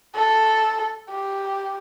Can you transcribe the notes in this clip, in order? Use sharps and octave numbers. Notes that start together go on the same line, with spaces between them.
A4
G4